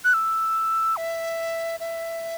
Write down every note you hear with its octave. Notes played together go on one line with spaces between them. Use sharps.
F#6
E6
E5
E5